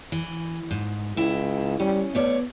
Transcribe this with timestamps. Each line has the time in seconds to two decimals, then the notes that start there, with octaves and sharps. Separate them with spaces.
0.12 E3
0.71 G#2
1.17 C#2 E4 G5
1.80 G3 C#4
2.15 A3 B3 C#5 D5